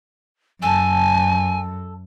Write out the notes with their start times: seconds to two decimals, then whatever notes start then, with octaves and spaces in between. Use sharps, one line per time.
0.62 F#2 A4 G#5 A5